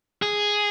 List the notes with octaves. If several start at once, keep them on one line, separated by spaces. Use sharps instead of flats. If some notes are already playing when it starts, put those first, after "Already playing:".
G#4